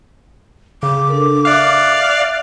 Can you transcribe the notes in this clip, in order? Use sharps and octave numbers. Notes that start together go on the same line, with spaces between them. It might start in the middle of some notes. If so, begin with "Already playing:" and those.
C#3 D6
D4 A4 A#4
D5 E5 F5 F#6